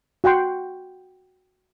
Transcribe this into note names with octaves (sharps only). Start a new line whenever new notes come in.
F#4 F#5 G5 C6